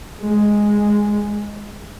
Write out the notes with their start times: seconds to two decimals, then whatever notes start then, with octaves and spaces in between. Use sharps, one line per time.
0.22 G#3